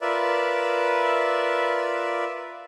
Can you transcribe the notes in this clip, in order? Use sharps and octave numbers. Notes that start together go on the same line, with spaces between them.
F4 A#4 B4 D5 E5